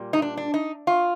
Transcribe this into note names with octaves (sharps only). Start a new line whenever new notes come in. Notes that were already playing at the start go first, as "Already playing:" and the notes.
Already playing: A#2 G3
D#4
D4
D4
D#4
F4